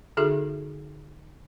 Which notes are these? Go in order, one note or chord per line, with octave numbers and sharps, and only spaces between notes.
D3 D#4 F#4 G#4 A4 E5